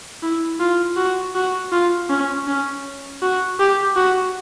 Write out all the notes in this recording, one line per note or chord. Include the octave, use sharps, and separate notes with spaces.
E4
F4
F#4
F#4
F4
C#4
C#4
F#4
G4
F#4